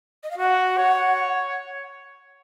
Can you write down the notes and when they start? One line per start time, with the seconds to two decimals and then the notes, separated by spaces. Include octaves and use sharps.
0.23 D#5
0.31 F5
0.38 F#4 F#5
0.78 C#5